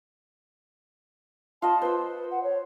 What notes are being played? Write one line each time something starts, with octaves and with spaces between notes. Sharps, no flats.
F4 D#5 F#5 A5
B4 C5 E6
F#5
C#5